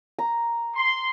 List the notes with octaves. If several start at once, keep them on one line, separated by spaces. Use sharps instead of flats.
A#5
C6